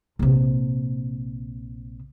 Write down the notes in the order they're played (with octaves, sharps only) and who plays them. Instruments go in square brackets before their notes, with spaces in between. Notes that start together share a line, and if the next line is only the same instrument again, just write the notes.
[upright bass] A#1 C3